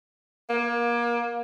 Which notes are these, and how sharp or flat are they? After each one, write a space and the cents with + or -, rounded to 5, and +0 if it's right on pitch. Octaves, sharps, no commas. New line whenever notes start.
A#3 +30